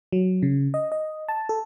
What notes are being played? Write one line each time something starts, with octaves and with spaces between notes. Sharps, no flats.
F#3
C#3
D#5
D#5
A5
A4